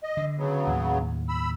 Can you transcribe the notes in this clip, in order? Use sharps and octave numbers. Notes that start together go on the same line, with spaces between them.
D#5
D3
C#3 F#3 B3
D#2 A2
B5 E6